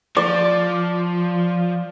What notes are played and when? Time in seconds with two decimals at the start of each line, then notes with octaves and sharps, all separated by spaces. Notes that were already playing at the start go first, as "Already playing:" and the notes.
0.17 F3 D5